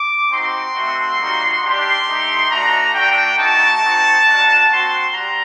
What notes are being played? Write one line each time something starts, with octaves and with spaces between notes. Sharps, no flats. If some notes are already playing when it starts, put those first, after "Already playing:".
Already playing: D6
C4 D#4 F#4 C6
A3 C4 F#4
G3 A#3 D#4 F#4
G3 D4 G4 C6
A3 D#4 G4
A3 D4 F#4 A#5
A3 D4 F#4 G5
A3 D#4 F#4 A5
C4 D#4 F#4
A#3 D4 F#4
C4 F#4 C6
G3 A#5